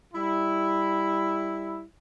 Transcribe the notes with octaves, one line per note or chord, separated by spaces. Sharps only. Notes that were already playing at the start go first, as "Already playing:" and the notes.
G3 E4